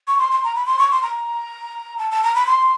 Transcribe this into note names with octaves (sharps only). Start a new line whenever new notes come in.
C#6
C6
C6
A#5
B5
C6
C#6
C6
A#5
A5
A5
A#5
B5
C6